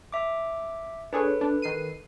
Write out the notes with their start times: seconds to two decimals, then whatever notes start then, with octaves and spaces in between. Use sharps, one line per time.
0.12 E5 D6
1.13 D4 G#4 A4 B4 C#5
1.41 D4
1.62 D#3 C7 D#7